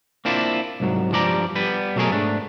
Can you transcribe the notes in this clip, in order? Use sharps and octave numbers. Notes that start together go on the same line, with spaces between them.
A#3 C4 D4 E4 F4
C2 G#2 F#3
G2 F3 G3 D5 D#5 A#5
G3 B3 B4
B2 F#3 A3 B3 G#4 A#4
G#2 A3 D4